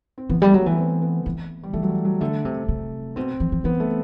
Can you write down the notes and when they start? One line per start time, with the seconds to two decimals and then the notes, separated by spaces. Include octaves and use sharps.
0.18 C4
0.29 E3 B3
0.42 G3 A3
0.54 F#3
0.62 B3
0.66 E3
0.78 C4
1.02 B3
1.26 E3
1.63 G3
1.73 E3 A3
1.83 F#3
1.89 G3
2.05 F#3
2.21 D3 A3
2.45 C3
2.68 C3
3.16 B2 C4
3.40 E3
3.52 E3
3.64 E3 B3
3.80 A3